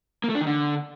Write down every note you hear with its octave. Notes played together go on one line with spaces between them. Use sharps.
A#3
A3
D4
D#3
D3